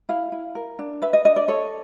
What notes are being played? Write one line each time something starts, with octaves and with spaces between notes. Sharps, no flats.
E4 F5
E4
A#4
D4
B4 E5
D#5
D4 D#5
D5
A4 C#5